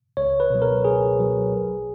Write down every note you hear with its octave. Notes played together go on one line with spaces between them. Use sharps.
C#2 C#5
B4
B2 F#3
A#4
C#2 G#4
B2 F#3
A#1